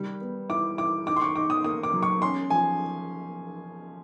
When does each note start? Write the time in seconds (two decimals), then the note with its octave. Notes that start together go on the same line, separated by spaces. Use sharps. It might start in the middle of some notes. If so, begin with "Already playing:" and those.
Already playing: D#3 G3
0.21 B3
0.49 E4 D6
0.78 E4 D6
1.07 D#4 D6
1.16 C6
1.22 C#6
1.36 D#4 D6
1.50 D#6
1.64 A#3 D#6
1.83 D6
1.94 F#3
2.02 C#6
2.22 C#4 C6
2.50 F3 G#5